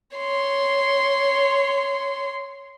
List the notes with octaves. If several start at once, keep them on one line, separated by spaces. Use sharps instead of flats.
C#5 C6